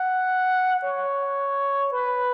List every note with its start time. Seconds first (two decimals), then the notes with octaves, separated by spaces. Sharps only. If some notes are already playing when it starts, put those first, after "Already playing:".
Already playing: F#5
0.83 C#5
1.92 B4